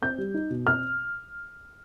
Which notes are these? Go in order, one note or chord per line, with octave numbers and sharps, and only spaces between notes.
C4 G6
G3
D#4
B2
C4 F6